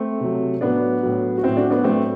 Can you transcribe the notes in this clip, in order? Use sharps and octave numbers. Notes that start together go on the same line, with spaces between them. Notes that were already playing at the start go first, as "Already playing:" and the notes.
Already playing: A3 C4
C3 F#3
A2 F#3 B3 D4
A2 F#3
F#4
A2 F#3 C4 E4
D4 F#4
B3 D4
A2 F#3 A3 C4